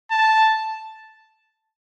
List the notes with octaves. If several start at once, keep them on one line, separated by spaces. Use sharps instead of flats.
A5